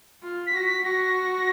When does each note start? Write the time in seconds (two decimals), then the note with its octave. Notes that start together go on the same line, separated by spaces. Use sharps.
0.22 F4
0.47 B6
0.53 F#4 A#6
0.65 B6
0.84 F#4 A#6